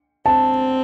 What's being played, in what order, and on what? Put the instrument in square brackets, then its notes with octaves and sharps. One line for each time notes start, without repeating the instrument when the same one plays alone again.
[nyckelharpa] C4 [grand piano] A5